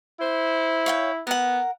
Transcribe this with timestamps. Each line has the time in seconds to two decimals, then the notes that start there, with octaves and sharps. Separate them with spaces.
0.21 E4 C5
0.86 C#5 F5 G5
1.27 B3 A#4 F#5